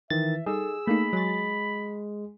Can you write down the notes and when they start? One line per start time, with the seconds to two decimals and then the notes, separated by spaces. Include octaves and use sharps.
0.10 D#3 E3 E5 A6
0.46 G3 D#4 G#4 A4 E6
0.87 A3 A#3 D#4 B5
1.13 F#3 G#3 A6